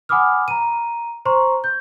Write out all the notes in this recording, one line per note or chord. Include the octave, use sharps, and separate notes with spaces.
F#5 G#5 B5 D6 D#6 F6
A#5 D#7
C5 A#5 C6 C#6
G6